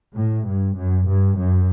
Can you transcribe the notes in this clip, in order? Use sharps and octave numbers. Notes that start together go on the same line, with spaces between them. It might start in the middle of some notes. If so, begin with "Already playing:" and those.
A2
G2
F#2
G2
F#2